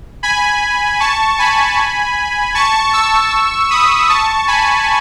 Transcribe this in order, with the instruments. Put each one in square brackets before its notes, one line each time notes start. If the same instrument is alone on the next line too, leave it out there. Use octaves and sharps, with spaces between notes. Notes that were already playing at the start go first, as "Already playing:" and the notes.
[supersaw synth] G#5 B5
A5 C#6
G#5 B5
A5 C#6
C#6 E6
B5 D#6
A5 C#6
G#5 B5